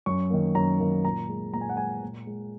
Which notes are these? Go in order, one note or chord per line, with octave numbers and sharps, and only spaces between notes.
F#2 C#6
D#3 A#3
F#2 A#5
D#3 A#3
A#2 A#5
G#3
A#2 A#5
G#5
F#5
G#3 G#5
A#2
G#3